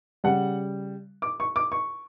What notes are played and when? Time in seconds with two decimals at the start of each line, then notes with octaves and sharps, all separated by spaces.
0.24 C#3 G3 F#5
1.22 D6
1.40 C#6
1.56 D6
1.72 C#6